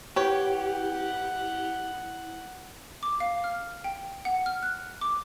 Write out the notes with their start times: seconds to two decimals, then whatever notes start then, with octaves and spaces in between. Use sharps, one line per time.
0.16 E4 G4 B4 C#5 F#5
3.03 D6
3.20 F5
3.44 F6
3.84 G5
4.25 F#5
4.46 F6
4.63 F#6
5.01 D6